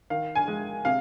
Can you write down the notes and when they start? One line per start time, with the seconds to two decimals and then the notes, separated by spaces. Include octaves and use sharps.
0.10 D#3 F5
0.35 G#5
0.48 G#3
0.85 C3 F5